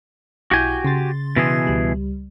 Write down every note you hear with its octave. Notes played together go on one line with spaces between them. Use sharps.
B1 E4 F#4 G4 G#5 G6
C#3 C6 A6
B2 E3 G#4
C#2 G3